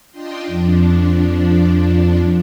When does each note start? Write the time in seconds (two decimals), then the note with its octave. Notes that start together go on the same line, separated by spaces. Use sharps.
0.11 D4 F4 D#5 G5 C6
0.47 F2 F3 D4